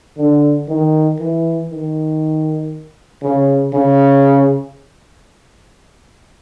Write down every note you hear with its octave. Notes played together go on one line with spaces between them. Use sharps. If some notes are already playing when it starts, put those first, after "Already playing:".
D3
D#3
E3
D#3
C#3
C#3